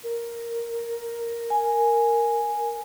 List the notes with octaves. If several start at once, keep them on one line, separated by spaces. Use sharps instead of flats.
A#4
G#5